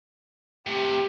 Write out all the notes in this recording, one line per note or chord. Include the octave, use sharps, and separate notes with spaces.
A2 C3 G4